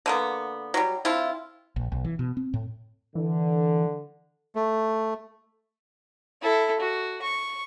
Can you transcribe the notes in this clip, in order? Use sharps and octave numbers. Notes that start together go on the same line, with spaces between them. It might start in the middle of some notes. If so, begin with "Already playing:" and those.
D3 A#3 B3
F#3 G3
C4 D4 E4 F4
A#1
B1
E3
B2
C4
A2
D3 E3
A3
E4 A4
F#4
C#6